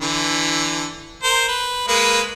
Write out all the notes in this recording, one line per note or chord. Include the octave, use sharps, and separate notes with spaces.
D3 E3
A#4 C5
B4
G#3 A#3 B4